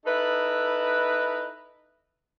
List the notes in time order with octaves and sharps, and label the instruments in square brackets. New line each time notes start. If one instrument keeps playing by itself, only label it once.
[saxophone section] D#4 E4 A4 B4